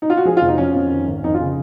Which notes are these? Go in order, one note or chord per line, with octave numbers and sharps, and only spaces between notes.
D#4
F4
F#4
F3 G#4
F4
F1
D#4
F3 C#4
F2
D#3
G#1
F2 D#4
F4
C#3